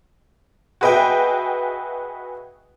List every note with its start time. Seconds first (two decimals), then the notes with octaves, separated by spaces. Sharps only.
0.81 F#4 G#4 B4 D#5 E5 G5